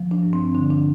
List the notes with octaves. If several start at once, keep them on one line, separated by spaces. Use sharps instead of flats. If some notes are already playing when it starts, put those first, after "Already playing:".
Already playing: F3
D4
G2
C4
D3 D4
D4